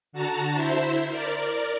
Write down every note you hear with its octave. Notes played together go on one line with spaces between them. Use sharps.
D3 F#4 A5 A#5
E4 C5 E5
A#4 D5